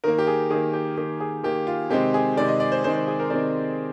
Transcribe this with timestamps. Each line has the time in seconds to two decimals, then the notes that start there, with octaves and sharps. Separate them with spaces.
0.04 D#3 A#3 A#4
0.18 G4
0.27 G#4
0.50 D#3 A#3 G#4
0.73 G4
0.97 D#3 A#3 G4
1.20 G#4
1.43 D#3 A#3 G4
1.67 F4
1.90 C3 D#3 G#3 C4 G4
2.14 G#4
2.37 C3 D#3 G#3 C4 D5
2.48 D#5
2.60 D5
2.72 C5
2.84 C3 D#3 G#3 C4 C5
2.95 C5
3.08 G#4
3.20 A#4
3.30 C3 D#3 G#3 C4 D5